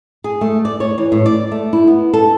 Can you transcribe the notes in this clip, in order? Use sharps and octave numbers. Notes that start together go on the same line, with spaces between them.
G#4
A3
D5
C#5
E3
A2
D5
A3
E4
B3
A4